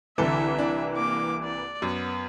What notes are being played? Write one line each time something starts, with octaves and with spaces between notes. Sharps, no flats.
C2 D3 E3 A4 E5
D4
A#3 D6
D5
F#2 B3